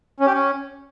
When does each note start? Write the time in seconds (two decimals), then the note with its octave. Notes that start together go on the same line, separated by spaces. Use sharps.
0.20 C#4
0.27 G4
0.33 C#4